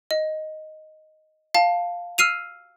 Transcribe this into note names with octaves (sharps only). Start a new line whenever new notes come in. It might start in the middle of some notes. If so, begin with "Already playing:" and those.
D#5
F5 A5
E6 F6 C7 D#7 F7